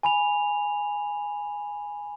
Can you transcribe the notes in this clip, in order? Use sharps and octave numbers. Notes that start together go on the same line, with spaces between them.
G#5 B5 F7